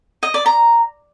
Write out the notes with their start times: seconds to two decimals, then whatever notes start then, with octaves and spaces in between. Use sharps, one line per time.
0.23 D#5
0.34 D5
0.46 A#5